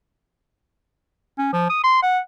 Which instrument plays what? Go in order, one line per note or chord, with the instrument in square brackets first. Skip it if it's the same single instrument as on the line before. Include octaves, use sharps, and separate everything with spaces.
[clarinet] C#4
F3
D#6
C6
F#5